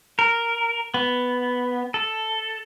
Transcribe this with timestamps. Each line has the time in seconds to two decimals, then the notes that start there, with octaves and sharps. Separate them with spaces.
0.19 A#4
0.94 B3
1.94 A4